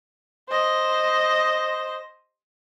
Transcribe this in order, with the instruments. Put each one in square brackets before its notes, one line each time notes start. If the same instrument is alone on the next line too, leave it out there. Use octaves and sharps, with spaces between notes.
[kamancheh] C5 D#5